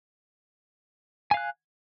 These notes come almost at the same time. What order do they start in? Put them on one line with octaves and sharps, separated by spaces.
G#5 F5 F#6